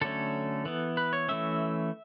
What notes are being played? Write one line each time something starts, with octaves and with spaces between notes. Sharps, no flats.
D3 F#3 A3 C#4 A4
E3 B3
B4
C#5
E3 A3 C#4 E5